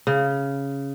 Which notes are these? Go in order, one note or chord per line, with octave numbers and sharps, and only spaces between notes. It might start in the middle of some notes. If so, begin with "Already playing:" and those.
C#3